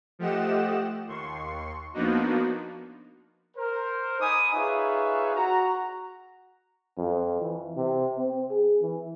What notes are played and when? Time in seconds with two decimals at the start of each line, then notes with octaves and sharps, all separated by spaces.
0.19 F3 A3 G4 D#5 F#5 E7
1.07 D#2 C6 C#6
1.94 F3 A#3 B3 D4 D#4 F#4
3.57 A#4 C5
4.20 D#4 G#5 B5 D6 D#6
4.54 D#4 F4 G#4 B4 C#5 E5
5.35 F#4 A#5
6.98 F2
7.41 E3
7.77 C3
8.18 C4
8.51 G#4
8.82 E3